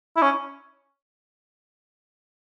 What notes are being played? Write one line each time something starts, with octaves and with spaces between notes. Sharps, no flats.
E4
C#4